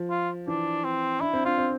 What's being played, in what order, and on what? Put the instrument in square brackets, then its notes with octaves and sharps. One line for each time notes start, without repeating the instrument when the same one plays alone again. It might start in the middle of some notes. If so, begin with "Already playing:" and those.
Already playing: [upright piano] F3
[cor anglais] F4
[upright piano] E3 [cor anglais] D4
[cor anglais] C4
[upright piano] D4 [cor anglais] E4
[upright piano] C4
[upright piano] D4 [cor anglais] F4
[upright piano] C4